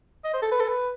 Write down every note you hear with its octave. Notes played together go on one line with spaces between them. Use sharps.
D#5
C5
A4
B4
A4
B4